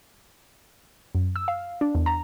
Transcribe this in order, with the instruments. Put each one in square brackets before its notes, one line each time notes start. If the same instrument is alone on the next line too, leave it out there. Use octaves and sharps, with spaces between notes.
[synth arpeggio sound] F#2
E6
F5
D4
E2
A#5